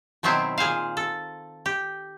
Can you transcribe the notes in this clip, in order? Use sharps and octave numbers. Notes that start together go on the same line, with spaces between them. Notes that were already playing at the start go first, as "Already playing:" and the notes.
B2 D#3 F#3 B3 C4 E4
A#2 G#4 C5 F5
A4
G4